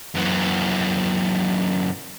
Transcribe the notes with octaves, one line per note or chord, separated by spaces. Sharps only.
F#2 E3